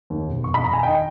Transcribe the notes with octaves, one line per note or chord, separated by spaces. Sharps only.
D#2
E1
E1 C#6
B5
E1 A#5
G#5
D#3 D#5 G5